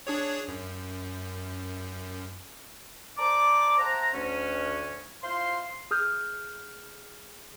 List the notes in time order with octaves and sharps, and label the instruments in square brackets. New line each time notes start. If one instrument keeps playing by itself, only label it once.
[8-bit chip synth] D4 G#4 C#5
F#2
[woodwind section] C5 D5 A5 A#5 D6
C5 E5 F#5 A5 A#5
D2 C#4
E4 F4 C5 F5 C6
[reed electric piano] G#4 D#6 F6 G6